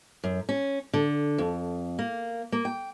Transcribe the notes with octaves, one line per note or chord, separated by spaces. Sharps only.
F#2
C#4
D3
F2
A#3
A#3
G5